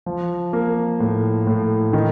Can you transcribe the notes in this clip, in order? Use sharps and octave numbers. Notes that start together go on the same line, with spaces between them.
F3
A#3
A2
A2
D#3